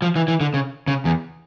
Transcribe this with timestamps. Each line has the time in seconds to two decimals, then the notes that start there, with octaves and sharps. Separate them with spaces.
0.02 F3
0.16 E3
0.28 E3
0.41 D3
0.54 C#3
0.88 C#3
1.05 E2